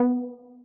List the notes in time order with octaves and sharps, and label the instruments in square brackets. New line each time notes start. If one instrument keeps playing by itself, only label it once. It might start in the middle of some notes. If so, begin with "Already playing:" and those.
Already playing: [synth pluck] B3